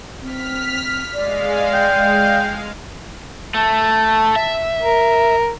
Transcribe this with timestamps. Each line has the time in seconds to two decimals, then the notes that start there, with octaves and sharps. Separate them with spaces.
0.22 C4 F6 B6
1.14 G#3 D5 F5
1.73 G5
3.54 A3 A5
4.36 E5
4.82 A#4